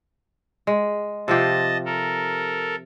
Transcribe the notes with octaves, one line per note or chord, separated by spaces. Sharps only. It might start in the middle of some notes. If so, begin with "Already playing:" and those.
G#3
C3 F3 G4 D#5 A5
A4 A#4